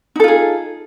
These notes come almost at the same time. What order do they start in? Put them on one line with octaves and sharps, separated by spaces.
D#4 A4 F4 G#4